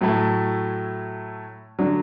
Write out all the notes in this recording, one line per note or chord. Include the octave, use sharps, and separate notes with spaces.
A2 F#3 A3 E4
D3 F#3 D4